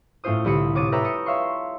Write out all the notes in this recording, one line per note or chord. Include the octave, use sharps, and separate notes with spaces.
A2 A3 C#4 F4 C5 D#6
C2 D3 G4 B5 D#6 C#7
C3 C#5 D6 D#6 A6 D#7
A4 B4 C#5 E5 G5 A#5
D#6 C#7
C#5 E5 F5 C6 C#6